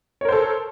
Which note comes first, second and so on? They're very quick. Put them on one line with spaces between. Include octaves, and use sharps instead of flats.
C#5 A#4 C5 A4